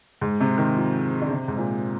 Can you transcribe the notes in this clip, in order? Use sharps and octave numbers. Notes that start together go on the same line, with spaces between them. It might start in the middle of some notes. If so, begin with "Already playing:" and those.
G#2
C3
D#3
F3
D3
C3
G#2
A#2